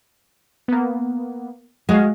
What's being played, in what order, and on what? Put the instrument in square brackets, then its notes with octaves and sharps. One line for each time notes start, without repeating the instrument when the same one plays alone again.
[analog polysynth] A#3 B3
[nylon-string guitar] G#3 [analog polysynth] F#4 G#4 F5